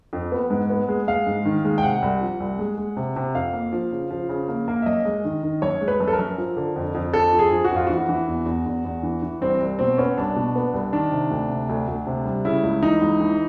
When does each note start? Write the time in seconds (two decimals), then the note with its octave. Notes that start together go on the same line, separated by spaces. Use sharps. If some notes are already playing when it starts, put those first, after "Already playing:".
0.13 F2
0.32 B3
0.50 G#2
0.70 B3
0.88 G#3
1.07 G#3 F5
1.27 G#2
1.45 D#3
1.65 G#3
1.78 G5
1.83 C3 F#5
2.02 C2
2.21 F3
2.40 C2
2.59 G#3
2.78 G#3
2.97 C3
3.16 C3
3.35 F2 F5
3.53 A#3
3.73 F3
3.92 C#3
4.11 F3
4.29 C#3
4.48 A#3
4.68 A#3
4.82 E5
4.86 F#2 D#5
5.05 G#3
5.25 D#3
5.43 D#3
5.62 F#2 C#5
5.81 G#3
5.88 B4
6.00 F#2
6.08 A4
6.13 A#4
6.19 F#2
6.38 F3
6.57 D3
6.76 F2
6.95 F2
7.14 F2 A4
7.33 F3
7.39 G#4
7.51 F3
7.64 F#4
7.71 F2 F4
7.87 E3 F#4
8.09 E3
8.28 E2
8.46 E2
8.66 E2
8.85 E2
9.03 E3
9.22 E3
9.41 C2 C4
9.60 C2
9.79 B2 C4
9.98 B3 C#4
10.18 C2 D4
10.36 B2
10.56 B3
10.73 C2
10.93 D#3 D4
11.11 C3
11.31 D2
11.50 C3
11.69 D2
11.88 D2
12.07 C3
12.25 G3
12.45 C#3 E4
12.64 C#2
12.83 E3 D#4
13.02 C#2
13.21 E3